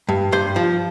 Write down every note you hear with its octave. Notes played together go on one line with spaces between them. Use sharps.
G2
G2 C5
F3